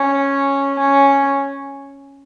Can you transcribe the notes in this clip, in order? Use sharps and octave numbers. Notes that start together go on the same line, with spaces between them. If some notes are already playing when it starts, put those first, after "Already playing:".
Already playing: C#4
C#4